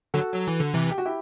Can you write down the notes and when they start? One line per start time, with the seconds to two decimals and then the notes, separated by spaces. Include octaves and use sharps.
0.14 D3 F#3 F#4 A4
0.34 F#3
0.47 E3
0.60 D3
0.73 C3 E3
0.91 G4
0.98 F#4
1.05 E4 G4